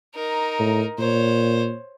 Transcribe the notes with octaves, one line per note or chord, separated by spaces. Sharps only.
D#4 A#4
A2
A#2 C5 C#5